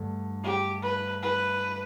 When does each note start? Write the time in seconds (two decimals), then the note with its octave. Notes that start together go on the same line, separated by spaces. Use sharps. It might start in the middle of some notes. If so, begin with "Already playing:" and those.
Already playing: G2 D3 A3
0.43 G4
0.83 B4
1.23 B4